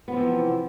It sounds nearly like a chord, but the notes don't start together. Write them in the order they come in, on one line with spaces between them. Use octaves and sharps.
B3 F3 C3 E3